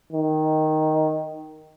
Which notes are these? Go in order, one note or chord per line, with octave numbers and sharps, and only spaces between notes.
D#3